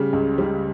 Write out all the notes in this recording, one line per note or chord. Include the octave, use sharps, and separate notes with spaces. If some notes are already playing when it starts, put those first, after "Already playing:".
Already playing: C#3 G3
C#2
C#3 G3